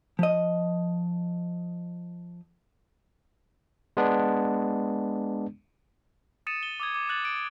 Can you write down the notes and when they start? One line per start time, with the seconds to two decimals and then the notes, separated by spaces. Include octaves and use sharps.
0.19 F3 D#5
3.97 G#3 B3 D4
6.47 D#6 A6 C#7 D#7 E7
6.63 G7
6.80 D6 D#6 G#6
6.95 D6
7.09 F#6 A6 F#7
7.25 D7